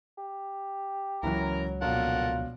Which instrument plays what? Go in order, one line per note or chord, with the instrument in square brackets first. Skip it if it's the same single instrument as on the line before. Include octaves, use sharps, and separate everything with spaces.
[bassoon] G4
[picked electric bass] C#2 F#3 [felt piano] E3 C#4 E4 [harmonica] A#4 A#5
[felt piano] A#1 B2 [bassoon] F4 [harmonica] A4 A#4 F#5